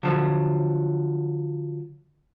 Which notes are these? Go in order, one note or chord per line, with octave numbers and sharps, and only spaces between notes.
D3 F3 F#3